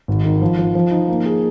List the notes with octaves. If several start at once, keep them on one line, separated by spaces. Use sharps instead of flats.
G#1
D#3
F3
F3
F3
D#4
A#3
G#4